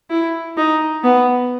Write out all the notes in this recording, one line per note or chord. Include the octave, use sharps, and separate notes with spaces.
E4
D#4
B3